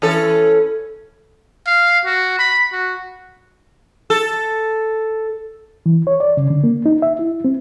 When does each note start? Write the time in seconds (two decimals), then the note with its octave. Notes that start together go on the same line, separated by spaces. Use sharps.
0.02 E3 C#4 A4
1.67 F5
2.05 F#4
2.39 B5
2.73 F#4
4.10 A4
5.86 E3
6.07 C#5
6.20 D5
6.37 C#3
6.50 D3
6.64 A#3
6.86 D#4
7.02 E5
7.19 E4
7.45 C4